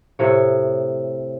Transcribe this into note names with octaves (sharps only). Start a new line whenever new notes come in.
A2 C3 C#5